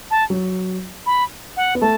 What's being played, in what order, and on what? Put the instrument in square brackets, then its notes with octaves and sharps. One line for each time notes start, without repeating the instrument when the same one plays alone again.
[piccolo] A5
[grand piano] F#3
[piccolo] B5
F#5
[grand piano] B3
[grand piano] A3 [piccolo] A5